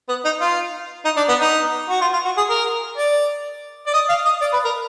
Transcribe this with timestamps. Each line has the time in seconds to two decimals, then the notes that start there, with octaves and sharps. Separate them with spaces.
0.09 B3
0.25 D#4
0.41 F4
1.05 D#4
1.17 D4
1.29 B3
1.41 D#4
1.89 F#4
2.01 F4
2.13 F4
2.25 F#4
2.37 G#4
2.49 A#4
2.97 D5
3.86 D5
3.94 D#5
4.09 F5
4.25 D#5
4.41 D5
4.53 B4
4.65 A#4